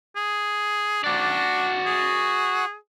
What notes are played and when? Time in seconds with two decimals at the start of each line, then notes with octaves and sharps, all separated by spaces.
0.16 G#4
1.04 D4 F#4 D5
1.86 G#4